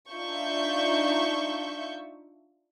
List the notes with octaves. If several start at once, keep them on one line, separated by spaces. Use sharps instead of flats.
D4 D#4 F4 E5 C#6 G6